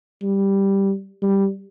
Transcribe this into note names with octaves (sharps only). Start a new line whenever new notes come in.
G3
G3